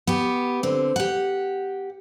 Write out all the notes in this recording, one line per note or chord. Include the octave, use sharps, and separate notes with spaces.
B3 G4
D3 C4
G4 F#5